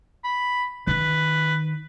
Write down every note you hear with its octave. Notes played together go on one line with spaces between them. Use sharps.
B5
D#3 B4